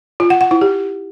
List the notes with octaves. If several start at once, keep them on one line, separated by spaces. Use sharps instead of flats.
F4
F#5
F#5
E4
G4